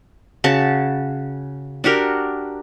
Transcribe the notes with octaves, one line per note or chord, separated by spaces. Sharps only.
C#3 F#4 A5
D4 F#4 G4 A#4